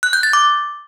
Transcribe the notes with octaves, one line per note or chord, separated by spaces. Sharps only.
F#6
G6
A6
D6